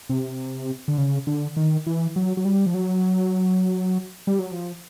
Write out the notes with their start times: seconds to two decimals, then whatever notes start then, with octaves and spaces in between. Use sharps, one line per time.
0.09 C3
0.88 D3
0.98 C#3
1.27 D3
1.57 D#3
1.87 E3
2.16 F#3
2.37 F#3
2.45 G3
2.66 F3
2.74 F#3
4.27 G3
4.39 F#3
4.51 F3